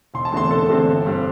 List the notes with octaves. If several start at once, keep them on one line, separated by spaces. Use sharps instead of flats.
E1 C6
A5
E2 D3 A3 C4 C6
E1 A4
E2 D3 A3 C4
G1
G2 G3 C4